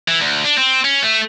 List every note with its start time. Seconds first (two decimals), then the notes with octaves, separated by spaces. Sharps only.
0.08 E3
0.21 D2
0.44 D4
0.58 C4
0.85 C#4
1.03 A3